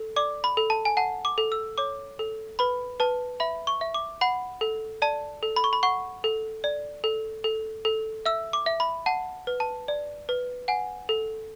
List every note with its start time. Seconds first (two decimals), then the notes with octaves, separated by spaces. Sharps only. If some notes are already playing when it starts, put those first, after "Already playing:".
Already playing: A4
0.16 D5 D6
0.44 B5
0.57 A4
0.70 A5
0.85 G#5
0.97 F#5 A5
1.25 D6
1.38 A4
1.52 E6
1.78 C#5 D6
2.19 A4
2.59 B4 B5
3.00 B4 A5
3.40 E5 B5
3.67 C#6
3.81 E5
3.94 D6
4.21 F#5 B5
4.61 A4
5.02 D5 A5
5.43 A4
5.56 B5
5.64 C#6
5.73 B5
5.83 F#5 C#6
6.24 A4
6.64 D5
7.04 A4
7.44 A4
7.85 A4
8.26 E5 E6
8.53 D6
8.66 E5
8.80 B5
9.06 F#5 A5
9.47 B4
9.60 A5
9.88 D5
10.29 B4
10.68 F#5 G#5
11.09 A4